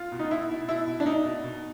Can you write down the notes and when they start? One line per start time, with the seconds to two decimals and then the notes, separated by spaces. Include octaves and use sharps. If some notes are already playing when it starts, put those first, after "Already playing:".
Already playing: F4
0.12 B2
0.19 D#4
0.31 B2 E4
0.50 B2
0.68 B2 E4
0.87 B2
1.00 D4
1.06 B2 D#4
1.25 B2
1.44 B2